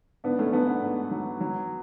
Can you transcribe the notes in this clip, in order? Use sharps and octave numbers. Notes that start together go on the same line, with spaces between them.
G#2 B3 D4
A3 C#4
F#3 B3 D4
B3
G#2
F#3
F#3